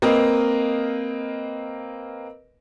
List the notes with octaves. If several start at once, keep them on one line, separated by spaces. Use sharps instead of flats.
A#3 C4 A#4 B4 D#5 F5